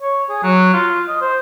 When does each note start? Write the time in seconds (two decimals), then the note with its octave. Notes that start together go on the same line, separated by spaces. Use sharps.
0.01 C#5
0.29 G#4
0.43 F#3
0.74 F4
1.08 D#5
1.21 C5